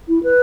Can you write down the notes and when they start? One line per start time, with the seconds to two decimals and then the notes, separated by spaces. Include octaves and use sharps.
0.08 E4
0.23 B4